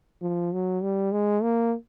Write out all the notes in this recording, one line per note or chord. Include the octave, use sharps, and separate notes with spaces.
F3
F#3
G3
G#3
A#3